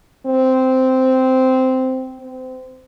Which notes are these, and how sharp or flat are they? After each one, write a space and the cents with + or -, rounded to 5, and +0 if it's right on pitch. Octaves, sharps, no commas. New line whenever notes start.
C4 -10
C4 -25